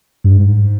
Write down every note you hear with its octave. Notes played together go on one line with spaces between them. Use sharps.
G2
G#2